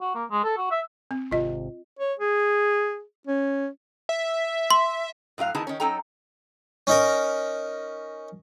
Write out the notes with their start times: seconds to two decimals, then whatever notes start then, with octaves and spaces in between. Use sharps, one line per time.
0.01 F#4
0.14 A#3
0.30 G#3
0.44 A4
0.57 F#4
0.71 E5
1.11 C4
1.31 G#1 C3 F4 D#5
1.99 C#5
2.19 G#4
3.27 C#4
4.09 E5
4.70 C6
5.38 A2 F#3 F4 F5
5.55 D#3 B3 D#4 E4 G#4 A5
5.67 D#3 C#4
5.80 F#3 C#4 D#4 A4 G5 A#5
6.87 C#4 D#4 A#4